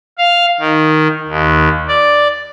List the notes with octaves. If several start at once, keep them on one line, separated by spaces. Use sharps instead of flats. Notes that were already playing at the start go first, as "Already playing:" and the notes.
F5
D#3
D#2
D5